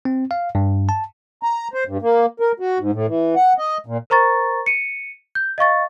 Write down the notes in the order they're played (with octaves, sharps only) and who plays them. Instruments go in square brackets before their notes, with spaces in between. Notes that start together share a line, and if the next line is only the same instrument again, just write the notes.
[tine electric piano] C4
F5
G2
A5
[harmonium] A#5
C5
G2
A#3
A#4
F#4
G#2
A2
E3
F#5
D#5
A#2
[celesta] A#4 C5 A#5 C#6 A6
C#7 D#7
G6
D#5 F5 C#6 A6